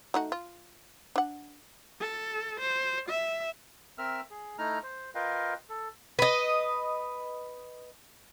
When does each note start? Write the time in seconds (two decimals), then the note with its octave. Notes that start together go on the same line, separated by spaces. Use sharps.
0.14 A3 D#4 F#4
0.32 F4
1.16 D4 F#5
2.00 A4
2.60 C5
3.09 E5
3.98 C4 A#4 E5 E6 F6
4.30 G#4
4.58 A3 D#4 E4 A#5 F6
4.83 C5
5.15 F4 A#4 B4 D#5 F5 G5
5.70 A4
6.19 B4 D#5